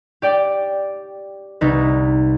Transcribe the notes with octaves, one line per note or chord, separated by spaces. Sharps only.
G4 D5 G5
C2 D#4 B4